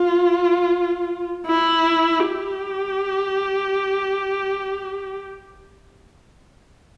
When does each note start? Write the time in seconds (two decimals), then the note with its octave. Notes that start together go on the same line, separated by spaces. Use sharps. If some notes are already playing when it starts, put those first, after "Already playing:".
Already playing: F4
1.46 E4
2.27 G4